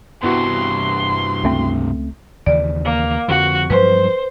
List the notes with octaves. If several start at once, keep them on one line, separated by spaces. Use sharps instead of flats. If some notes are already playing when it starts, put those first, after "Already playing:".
G2 C3 B3 E4 F#4 C6
C#2 A3 C4
D#2 C#3 E3 D5
A#3
F2 D3 F3 F#4
G2 F3 F#3 B4 C5